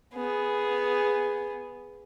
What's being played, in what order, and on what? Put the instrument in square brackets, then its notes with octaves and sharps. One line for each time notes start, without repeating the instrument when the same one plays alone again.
[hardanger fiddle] B3 G#4